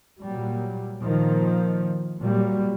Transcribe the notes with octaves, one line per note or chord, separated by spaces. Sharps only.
A#2 F#3 G3
A#2 D#3 F3
A#2 F#3 G3